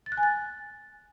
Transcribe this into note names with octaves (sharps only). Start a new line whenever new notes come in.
A6
F#6
G#5
A6